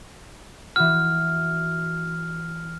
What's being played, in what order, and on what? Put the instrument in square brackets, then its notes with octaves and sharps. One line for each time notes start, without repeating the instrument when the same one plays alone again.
[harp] E3 F#4 [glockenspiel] F6